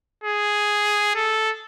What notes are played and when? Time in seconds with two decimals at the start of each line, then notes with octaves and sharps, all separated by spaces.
0.24 G#4
1.15 A4